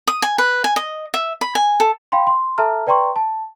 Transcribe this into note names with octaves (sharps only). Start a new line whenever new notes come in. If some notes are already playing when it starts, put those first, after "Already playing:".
D#6
G#5
B4
G#5
D#5
E5
B5
G#5
A4
F5 G5 B5 C6
C6
A4 E5 A5 A#5 F6
B4 D5 G5 A#5 C6 C#6
A5